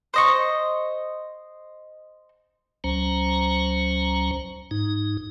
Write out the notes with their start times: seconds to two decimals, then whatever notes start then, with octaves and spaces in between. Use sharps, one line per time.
0.14 C5 D#5 C#6
2.84 C#2 F#3 C#4 C5 A#5
4.71 G#2 D#4